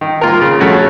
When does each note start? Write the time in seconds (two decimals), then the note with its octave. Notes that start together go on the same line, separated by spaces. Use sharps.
0.01 D#3
0.21 A#3 F4 A#4
0.41 C#3
0.60 F3 A3 C#4 F#4